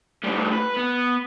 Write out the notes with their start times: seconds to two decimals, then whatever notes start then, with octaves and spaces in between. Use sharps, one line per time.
0.24 A2 G3
0.52 B4
0.77 B3